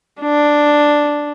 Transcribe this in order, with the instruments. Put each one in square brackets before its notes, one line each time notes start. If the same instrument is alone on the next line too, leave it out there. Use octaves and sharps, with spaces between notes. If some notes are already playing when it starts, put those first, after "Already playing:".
[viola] D4